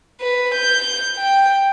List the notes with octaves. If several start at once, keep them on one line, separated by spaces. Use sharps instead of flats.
B4
G6
G5